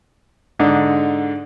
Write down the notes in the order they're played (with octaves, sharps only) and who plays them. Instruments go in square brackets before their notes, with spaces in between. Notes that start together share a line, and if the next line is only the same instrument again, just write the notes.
[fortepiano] G#2 D3 D4 D#4